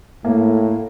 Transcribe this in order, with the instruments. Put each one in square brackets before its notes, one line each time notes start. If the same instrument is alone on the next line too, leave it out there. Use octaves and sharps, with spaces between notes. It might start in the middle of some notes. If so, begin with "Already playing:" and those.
[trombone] A2 [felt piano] A#3